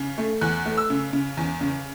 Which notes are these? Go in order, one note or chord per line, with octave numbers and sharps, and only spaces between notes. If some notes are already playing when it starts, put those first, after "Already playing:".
Already playing: C#3
A3
E2 F#6
A3
E6
C#3
C#3
E2
C#3